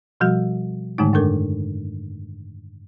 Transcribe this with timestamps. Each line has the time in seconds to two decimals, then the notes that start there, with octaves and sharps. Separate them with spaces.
0.20 B2 F3 G3 F#4
0.98 G#2 D3 D#3 G#3 A3 D#4
1.13 F#2 D4 A4 A#4 D6